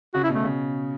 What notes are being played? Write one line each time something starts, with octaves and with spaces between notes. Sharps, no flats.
C#3 F#4
E4
B2 A3
C#3